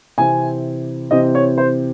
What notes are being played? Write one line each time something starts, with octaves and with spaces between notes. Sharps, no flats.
C3 E3 C4 G#5
C3 E3 C4 D#5
C#5
C5